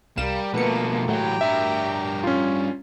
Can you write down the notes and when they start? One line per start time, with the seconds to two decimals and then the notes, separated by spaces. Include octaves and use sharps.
0.17 C2 G3 A#4 F5 E7
0.54 B2 F3 A3 A#3 B4 C#7
1.08 A2 E3 F#3 F#4 G4 G5 A#5
1.41 G2 A#4 E5
2.24 C#4 F4